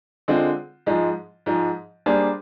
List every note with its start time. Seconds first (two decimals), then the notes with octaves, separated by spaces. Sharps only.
0.28 D3 G#3 C4 F4
0.86 G#2 F3 G#3
1.46 G#2 F3 G#3
2.06 G3 A#3 D4 G#4 C5